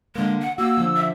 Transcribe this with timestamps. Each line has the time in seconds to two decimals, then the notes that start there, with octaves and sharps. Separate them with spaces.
0.16 D3 G#3 A#3
0.41 F#5
0.58 A#3 F#4 E6
0.78 D3 F3
0.96 E5